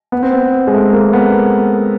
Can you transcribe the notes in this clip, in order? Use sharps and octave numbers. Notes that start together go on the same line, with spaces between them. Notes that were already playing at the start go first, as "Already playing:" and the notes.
B3
C4
B3
G#3
A3
A#3
B3